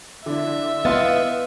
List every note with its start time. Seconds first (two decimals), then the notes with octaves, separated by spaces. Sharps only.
0.26 D3 D4 E4 E5
0.85 B3 E4 D#5 F5 C6 A6